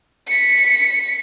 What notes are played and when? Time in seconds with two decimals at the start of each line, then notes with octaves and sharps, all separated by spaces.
0.28 B6 C#7